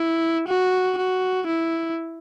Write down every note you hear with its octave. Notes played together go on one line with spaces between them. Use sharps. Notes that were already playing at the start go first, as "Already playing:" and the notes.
Already playing: E4
F#4
F#4
E4